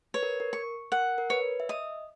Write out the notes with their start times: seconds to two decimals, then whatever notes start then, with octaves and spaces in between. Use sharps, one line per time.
0.14 B4 C#5
0.23 A#4
0.40 A#4
0.53 C#6
0.92 A#4 F#5
1.18 A#4
1.30 B4 C#5
1.60 E5
1.69 D#5 D#6